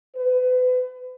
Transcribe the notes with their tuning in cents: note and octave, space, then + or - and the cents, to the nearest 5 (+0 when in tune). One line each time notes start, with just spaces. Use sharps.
B4 +35